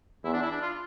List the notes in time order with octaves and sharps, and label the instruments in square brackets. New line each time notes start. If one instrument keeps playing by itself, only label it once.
[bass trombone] E2 [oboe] E4
[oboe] D4
E4
D4
F4